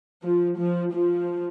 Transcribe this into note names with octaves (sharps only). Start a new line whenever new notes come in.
F3
F3
F3